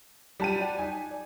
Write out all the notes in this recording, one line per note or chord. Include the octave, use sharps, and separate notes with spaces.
G3 D4 F4 G4 A5 D#7
F#4 D5 G5
D#4 G#5
D5